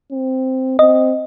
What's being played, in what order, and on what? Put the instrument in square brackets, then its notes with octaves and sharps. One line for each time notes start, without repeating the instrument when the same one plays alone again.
[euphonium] C4
[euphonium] C4 [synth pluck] D#5